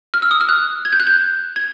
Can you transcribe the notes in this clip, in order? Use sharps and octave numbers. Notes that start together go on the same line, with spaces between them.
F6
E6
D#6
F6
F#6
G#6
G6
F#6
G6
G#6